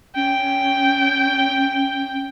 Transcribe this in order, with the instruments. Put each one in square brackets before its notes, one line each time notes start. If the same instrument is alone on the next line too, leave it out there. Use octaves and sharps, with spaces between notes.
[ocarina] C#4 [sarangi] G5